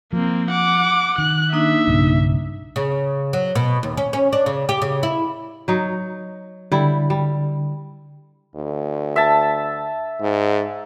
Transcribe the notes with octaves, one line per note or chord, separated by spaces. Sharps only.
F3 A#3 C4
F#5 D6
D#3 F#6
A#3 D4 D#4 E5
B1 G2 C#3
C#3
F#3
B2
D#2
C#4
C#4
D4
C#3
G4
C#3
E4
F#3 D#4
D3 G3 E4
G3
D2
E5 A5
G#2